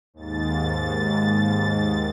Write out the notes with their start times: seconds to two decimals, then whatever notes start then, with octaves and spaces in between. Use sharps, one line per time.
0.14 D#2 G#2 A6